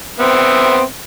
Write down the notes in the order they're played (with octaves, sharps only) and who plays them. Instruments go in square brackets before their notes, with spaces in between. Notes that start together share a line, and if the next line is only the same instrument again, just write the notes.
[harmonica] B3 C4 E5